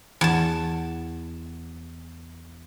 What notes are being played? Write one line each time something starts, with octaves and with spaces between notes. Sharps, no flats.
E2 A5